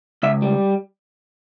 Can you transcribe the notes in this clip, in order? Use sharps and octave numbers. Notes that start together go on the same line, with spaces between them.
C#2 E5
G3